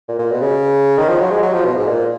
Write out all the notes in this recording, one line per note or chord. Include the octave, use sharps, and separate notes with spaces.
A#2
A#2
B2
C#3
D#3
F3
F#3
G#3
F#3
F3
B2
G#2
A#2